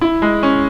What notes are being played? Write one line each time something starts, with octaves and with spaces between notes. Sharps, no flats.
E4
G#3
C#4